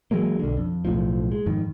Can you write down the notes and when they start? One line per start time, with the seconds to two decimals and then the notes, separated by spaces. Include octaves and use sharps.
0.11 E3 F#3 G#3 A#3
0.39 B1 D3
0.57 F2
0.85 B1 A2 F3
1.32 G#3
1.46 F2 G#2 D#3